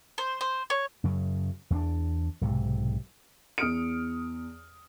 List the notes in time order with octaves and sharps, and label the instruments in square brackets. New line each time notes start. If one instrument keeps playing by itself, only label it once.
[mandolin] C5
C5
C#5
[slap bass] F#2 C#3 F#3
E2 C4 D4
B1 G#2 C3
[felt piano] E2 D#6 F6 C#7 D7